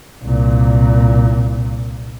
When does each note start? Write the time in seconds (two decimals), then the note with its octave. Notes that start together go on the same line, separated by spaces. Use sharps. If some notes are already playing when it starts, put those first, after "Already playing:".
0.24 C2 A#2